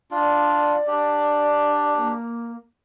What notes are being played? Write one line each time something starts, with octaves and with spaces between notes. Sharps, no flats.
D4 F4 D5
D4 G4
A#3